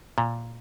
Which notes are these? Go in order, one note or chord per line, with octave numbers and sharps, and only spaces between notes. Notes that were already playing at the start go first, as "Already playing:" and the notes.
A#2